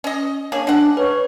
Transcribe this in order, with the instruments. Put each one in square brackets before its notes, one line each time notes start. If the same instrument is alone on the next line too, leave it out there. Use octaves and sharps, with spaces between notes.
[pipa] C#4 D#5
[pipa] A#3 D4 G#4 [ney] C#5
[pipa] G#3 F#5 [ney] D4
[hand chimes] B4 [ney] C#5